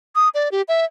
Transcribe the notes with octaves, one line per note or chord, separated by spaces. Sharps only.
D#6
D5
G4
E5